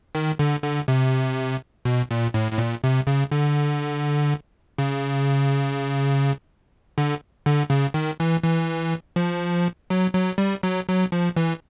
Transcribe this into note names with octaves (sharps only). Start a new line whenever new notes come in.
D#3
D3
D3
C3
B2
A#2
A2
A2
A#2
C3
C#3
D3
C#3
D3
D3
C#3
D#3
E3
E3
F3
F#3
F#3
G3
F#3
F#3
F3
E3